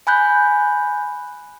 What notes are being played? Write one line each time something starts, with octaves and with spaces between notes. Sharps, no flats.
G#5 B5 F#6 G6